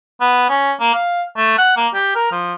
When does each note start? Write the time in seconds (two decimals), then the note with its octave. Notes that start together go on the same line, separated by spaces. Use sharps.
0.20 B3
0.49 C#4
0.80 A#3
0.94 F5
1.37 A3
1.58 F#5
1.77 A#3
1.94 G4
2.15 A#4
2.32 F3